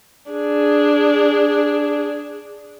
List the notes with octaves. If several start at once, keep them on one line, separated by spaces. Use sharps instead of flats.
D4 G#4